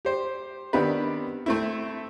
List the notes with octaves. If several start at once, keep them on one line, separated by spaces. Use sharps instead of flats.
G4 C5
D#3 B3 C4 D4 G4 B4
A3 C4 E4